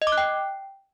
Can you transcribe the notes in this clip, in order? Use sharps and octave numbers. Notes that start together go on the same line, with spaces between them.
D#5
D6
F#6
G5